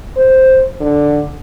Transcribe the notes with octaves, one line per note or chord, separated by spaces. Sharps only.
C5
D3